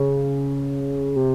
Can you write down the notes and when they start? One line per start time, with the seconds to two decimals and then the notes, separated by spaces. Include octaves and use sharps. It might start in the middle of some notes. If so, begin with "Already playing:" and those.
Already playing: C#3
1.16 C3